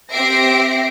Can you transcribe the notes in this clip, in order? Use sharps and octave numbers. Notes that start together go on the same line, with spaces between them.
C4 G4 E5 A#6 C7 D7